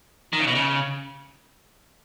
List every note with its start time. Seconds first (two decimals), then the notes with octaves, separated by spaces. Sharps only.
0.33 D#3
0.40 C#3
0.47 B2
0.55 C#3